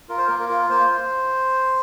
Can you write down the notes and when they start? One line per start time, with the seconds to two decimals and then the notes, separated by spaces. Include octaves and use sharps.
0.09 F4 A#4
0.18 C5
0.27 A#3 A#4
0.40 A#4
0.49 F4
0.70 A#3 C5